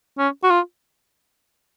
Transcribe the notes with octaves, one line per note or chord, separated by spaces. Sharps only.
C#4
F#4
F4